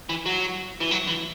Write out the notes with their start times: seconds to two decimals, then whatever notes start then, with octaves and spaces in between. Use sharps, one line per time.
0.09 E3
0.26 F#3
0.81 E3
0.91 F#3
1.08 E3